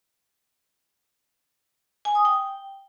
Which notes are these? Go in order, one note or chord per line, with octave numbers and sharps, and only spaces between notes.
G#5
D#6
G5